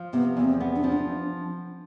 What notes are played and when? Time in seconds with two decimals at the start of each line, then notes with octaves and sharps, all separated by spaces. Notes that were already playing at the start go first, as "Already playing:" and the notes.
Already playing: F3
0.13 C3 B3
0.37 E2 B3
0.45 C4
0.60 B3
0.76 D4
0.84 F3 C4
0.92 D4